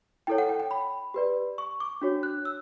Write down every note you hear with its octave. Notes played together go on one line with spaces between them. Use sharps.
E4 A4 C#5 G5
F#5
G5
G5
B5
G4 B4 D5
C#6
D6
D4 F#4 C#5
F#6
E6